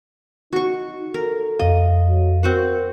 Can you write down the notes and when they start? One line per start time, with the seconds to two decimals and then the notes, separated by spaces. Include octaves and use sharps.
0.53 D#4 F#4 C#6
1.14 A4 A#4
1.59 F2 D#5 F5
2.09 F#3
2.43 C4 F#4 A#4 F#5